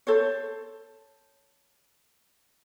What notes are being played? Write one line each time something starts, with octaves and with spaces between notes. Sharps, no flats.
A4 C5 C#5